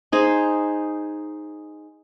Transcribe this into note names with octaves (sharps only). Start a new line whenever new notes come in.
D#4 G#4 C5